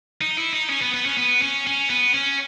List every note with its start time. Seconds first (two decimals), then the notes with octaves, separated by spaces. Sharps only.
0.21 D#4
0.37 E4
0.53 D#4
0.70 C#4
0.81 B3
0.94 B3
1.06 C#4
1.17 B3
1.42 C#4
1.67 C#4
1.90 B3
2.14 C#4